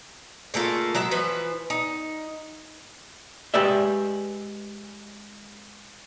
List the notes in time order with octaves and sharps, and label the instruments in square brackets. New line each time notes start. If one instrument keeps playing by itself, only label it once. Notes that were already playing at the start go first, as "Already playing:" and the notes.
[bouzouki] C#3 A3 A#3 F4
F#3 G#3 E5
E3 F3 B4
D#4
[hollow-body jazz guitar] G#3 G4 B4 D5 E5